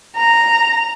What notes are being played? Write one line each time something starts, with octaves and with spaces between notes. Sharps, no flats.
A#5